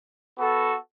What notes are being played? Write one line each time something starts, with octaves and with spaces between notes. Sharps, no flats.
B3 F#4 A4